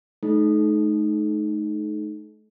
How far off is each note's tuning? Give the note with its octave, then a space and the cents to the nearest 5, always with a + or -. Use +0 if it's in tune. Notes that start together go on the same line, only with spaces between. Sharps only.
A3 -35 D#4 +0 A4 -40